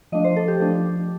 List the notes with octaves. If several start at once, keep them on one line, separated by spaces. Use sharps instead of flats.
F3 A3 D4 D#5
C5
A4
G4
F3 A3 D4